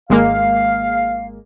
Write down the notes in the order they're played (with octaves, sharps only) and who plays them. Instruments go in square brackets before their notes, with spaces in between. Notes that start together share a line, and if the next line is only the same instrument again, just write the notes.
[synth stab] G#1 G#3 A#3 [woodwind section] F5